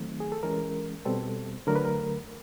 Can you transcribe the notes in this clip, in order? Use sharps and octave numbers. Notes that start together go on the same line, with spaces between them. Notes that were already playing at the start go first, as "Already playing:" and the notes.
Already playing: D#3 F#3 A3 C4
G#4
A4
E3 G#3 C#4 A#4
B2 G3 C4 A4
D3 F#3 A3 A#4
B4
A#4